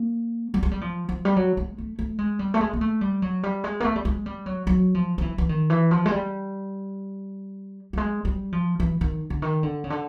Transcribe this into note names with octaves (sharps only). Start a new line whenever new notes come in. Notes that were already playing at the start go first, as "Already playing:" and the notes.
Already playing: A#3
G3
G#3
G3
F3
F3
G3
F#3
G#3
A3
A3
G#3
G3
A3
G#3
A#3
A3
G3
F#3
G3
G#3
A#3
A3
G3
G#3
G3
F#3
F#3
F3
F3
E3
E3
D#3
E3
F3
G#3
G3
G3
G#3
G3
F3
E3
D#3
D3
D#3
D3
C#3
D3